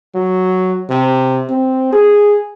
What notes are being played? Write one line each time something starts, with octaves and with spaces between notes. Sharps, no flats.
F#3
C3
C4
G#4